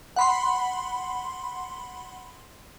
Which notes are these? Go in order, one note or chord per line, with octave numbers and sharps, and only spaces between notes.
F#5 B5 C6